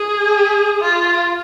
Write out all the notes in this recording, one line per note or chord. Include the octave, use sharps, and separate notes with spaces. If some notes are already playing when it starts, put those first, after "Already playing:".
Already playing: G#4
F4